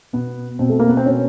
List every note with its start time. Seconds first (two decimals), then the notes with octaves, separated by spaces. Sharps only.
0.13 B2 B3
0.59 B2 C4
0.69 A3
0.80 A#3
0.89 B3
0.97 C4
1.06 B2 C#4